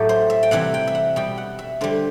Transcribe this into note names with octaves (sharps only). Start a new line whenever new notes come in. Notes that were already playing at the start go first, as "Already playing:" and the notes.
Already playing: A2 F#3 A3 G4
C5
E5
G5
C3 E3 G3 F#5
G5
E5
F#5
B2 G3 G5
F#5
E5
D3 G3 C5